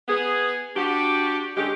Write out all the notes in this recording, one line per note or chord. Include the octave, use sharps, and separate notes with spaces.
B3 G#4
D4 F#4 G4
D3 G#3 C#4 G4